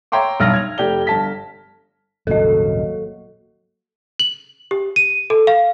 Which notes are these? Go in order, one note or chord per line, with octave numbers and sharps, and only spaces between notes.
C#5 E5 G5 A#5 C6 D6
B1 G2 F6 A#6
G#6 F7
F1 G4 D5 G7
G1 A5 B6
D#1 G#1 C#3 F#3 A#3 F#4 A4 D#5
F#7
G4
D#7
A4
F5